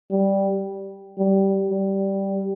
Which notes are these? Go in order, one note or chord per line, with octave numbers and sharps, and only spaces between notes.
G3
G3
G3